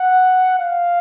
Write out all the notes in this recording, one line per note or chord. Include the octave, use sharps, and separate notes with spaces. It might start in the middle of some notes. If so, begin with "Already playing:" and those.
Already playing: F#5
F5